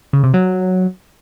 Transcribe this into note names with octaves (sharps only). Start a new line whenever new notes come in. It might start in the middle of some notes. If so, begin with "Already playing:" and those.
C#3
C3
F#3